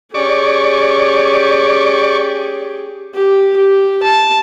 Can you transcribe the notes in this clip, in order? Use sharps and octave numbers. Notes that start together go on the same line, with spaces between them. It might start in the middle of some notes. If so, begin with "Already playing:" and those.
C#4 G4 G#4 D5 C#6
G4
G4
A5